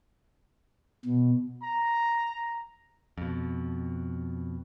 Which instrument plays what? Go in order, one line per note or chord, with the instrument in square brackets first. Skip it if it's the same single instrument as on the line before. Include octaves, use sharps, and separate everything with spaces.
[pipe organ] B2
[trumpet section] A#5
[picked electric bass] F2 B2